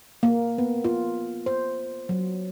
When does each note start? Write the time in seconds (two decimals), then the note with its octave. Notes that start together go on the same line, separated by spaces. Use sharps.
0.23 A#3
0.58 B3
0.84 F4
1.46 C5
2.09 F#3